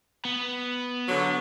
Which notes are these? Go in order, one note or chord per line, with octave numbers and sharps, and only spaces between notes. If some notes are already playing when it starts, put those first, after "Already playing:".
B3
D3 F#3